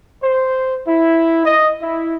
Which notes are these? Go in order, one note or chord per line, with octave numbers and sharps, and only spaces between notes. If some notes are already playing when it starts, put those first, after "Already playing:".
C5
E4
D#5
E4